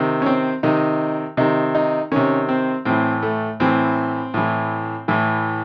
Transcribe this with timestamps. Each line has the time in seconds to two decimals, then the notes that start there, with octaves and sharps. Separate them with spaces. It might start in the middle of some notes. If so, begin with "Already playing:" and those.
Already playing: C3 D#3
0.22 C#4
0.26 C4
0.63 C3 D#3 D#4
1.37 C3 D#3 D#4
1.75 D#4
2.12 C3 D#3 C#4
2.49 C4
2.85 A2 E3 C4
3.23 A3
3.60 A2 E3 C4
4.34 A2 E3
5.08 A2 E3